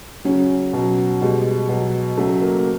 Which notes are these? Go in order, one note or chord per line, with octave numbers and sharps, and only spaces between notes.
C#3 F#3 C#4
B2 F#3
B2 G3 G#3
B2 F#3
C#3 F#3 A3
A#3
A#3